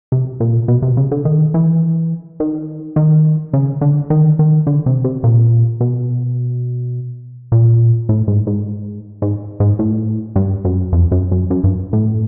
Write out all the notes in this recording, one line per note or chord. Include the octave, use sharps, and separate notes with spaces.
C3
A#2
B2
C3
C#3
D3
D#3
E3
D#3
D#3
C#3
D3
D#3
D#3
D3
C3
C3
A#2
B2
A#2
A2
G#2
G#2
G#2
G#2
A2
G2
F#2
F2
F#2
F#2
F#2
G2
A2